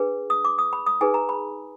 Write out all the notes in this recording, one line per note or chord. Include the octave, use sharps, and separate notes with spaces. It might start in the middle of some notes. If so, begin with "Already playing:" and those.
Already playing: D4 G#4 B4
D#6
D6
D#6
B5
D#6
D#4 G#4 B4 G#5
A#5
B5